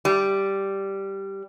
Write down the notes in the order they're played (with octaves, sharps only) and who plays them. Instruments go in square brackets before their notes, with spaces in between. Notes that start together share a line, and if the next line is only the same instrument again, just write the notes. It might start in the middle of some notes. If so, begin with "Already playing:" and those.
[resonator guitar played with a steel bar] G3